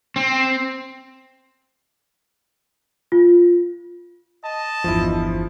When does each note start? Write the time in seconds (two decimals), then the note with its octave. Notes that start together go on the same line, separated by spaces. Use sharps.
0.16 C4
3.12 F4
4.43 D#5 A5
4.84 G1 E2 F3 E4